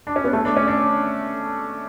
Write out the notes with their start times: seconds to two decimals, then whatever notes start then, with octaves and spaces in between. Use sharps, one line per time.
0.07 D4
0.16 C#4
0.24 B3
0.33 A3
0.45 D4
0.57 C#4
0.68 D4